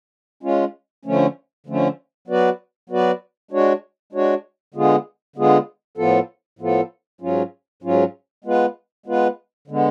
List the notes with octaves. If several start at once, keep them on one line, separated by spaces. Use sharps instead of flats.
G#3 C#4 F4
D3 F3 A3 C#4
D3 F3 A3 C#4
F#3 B3 F#4 B4 D5
F#3 B3 F#4 B4 D5
G#3 D4 F#4 C#5
G#3 D4 F#4 C#5
D3 G#3 B3 F4 G#4
D3 G#3 B3 F4 G#4
A2 F3 B3 F4 A4
A2 F3 B3 F4 A4
G#2 F#3 C#4 F4
G#2 F#3 C#4 F4
G#3 B3 F4 B4
G#3 B3 F4 B4
D3 G#3 B3